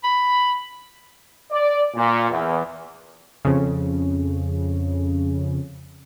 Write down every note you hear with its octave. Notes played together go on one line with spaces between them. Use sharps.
B5
D5
A#2
E2
F2 C#3